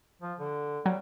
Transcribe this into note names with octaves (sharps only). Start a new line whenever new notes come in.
F3
D3
F#3 G3